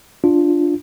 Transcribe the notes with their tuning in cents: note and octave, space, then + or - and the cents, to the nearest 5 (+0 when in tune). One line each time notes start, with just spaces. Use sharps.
D4 +0 F4 +0